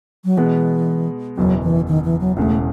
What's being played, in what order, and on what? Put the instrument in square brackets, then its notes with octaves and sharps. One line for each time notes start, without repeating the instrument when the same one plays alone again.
[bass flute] F#3
[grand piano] B2 G#3 B3 [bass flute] E3
[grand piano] F#1 E2 B2 [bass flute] F#3
[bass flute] E3
D#3
E3
F#3
[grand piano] E1 E2 C#3 [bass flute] A3